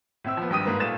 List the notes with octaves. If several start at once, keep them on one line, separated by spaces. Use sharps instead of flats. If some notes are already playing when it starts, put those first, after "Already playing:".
A2 C4 E5 E6
F3 B3
G#1 G2 G5 D#6 D#7
G#2 A#3 B4
A#2 A3 F5 A6 E7